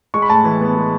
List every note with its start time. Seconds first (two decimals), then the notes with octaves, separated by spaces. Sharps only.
0.14 G#3 C#6
0.22 B5
0.30 A2 A5
0.44 E3
0.61 B3
0.77 G#3